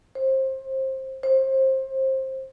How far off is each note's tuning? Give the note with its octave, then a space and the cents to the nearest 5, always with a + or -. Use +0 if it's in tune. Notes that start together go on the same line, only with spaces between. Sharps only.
C5 +25
C5 +25